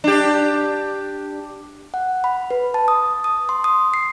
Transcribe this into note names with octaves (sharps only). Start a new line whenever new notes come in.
D4 G4
F#5
B5
B4
A5
D#6
D#6
C6
D#6
C7